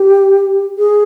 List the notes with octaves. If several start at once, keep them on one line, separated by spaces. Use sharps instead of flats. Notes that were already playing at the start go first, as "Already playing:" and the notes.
Already playing: G4
G#4